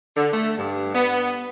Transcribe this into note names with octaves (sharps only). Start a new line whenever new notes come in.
D3
A3
G2
B3